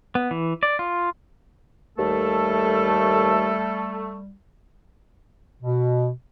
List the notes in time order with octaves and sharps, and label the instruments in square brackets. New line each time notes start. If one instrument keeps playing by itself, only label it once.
[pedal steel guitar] B3
E3
D5
F4
[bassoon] D#2 [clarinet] G3 [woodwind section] A3 [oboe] A4
[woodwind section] B2